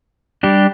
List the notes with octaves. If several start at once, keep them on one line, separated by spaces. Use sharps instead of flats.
G3 D4 G4